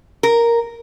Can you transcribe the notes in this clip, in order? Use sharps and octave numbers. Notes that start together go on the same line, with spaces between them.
A#4